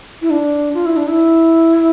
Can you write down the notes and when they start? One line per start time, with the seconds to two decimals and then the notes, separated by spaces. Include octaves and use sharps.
0.22 E4
0.30 D4
0.74 F4
0.86 E4
0.97 D4
1.08 E4